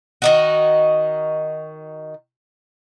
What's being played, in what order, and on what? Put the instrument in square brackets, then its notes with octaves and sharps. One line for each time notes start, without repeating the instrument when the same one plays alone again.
[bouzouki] D#3 D#4 F#4